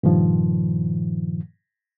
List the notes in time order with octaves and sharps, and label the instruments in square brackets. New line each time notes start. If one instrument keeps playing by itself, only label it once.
[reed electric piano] G2 A#2 D#3 F3